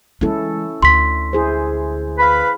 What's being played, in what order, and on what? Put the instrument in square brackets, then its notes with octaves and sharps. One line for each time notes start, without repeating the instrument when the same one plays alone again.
[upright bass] E3 G#3 [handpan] C#4 E4 A4
[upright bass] D2 [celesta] C6 B6
[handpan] E4 G#4 C5
[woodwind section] B4 F5 B5